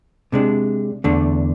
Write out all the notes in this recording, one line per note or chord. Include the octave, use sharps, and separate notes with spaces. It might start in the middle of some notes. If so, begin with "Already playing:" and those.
C3 G#3 D4
E2 D3 A3 D4